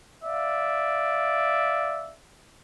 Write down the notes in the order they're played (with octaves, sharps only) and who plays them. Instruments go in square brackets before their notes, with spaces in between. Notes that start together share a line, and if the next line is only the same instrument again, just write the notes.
[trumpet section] D5 E5 F5